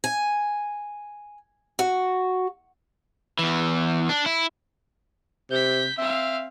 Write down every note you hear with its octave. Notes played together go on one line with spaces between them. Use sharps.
G#5
F#4
E2 E3
D4
E4
C3 G6 B6
C4 E5 F5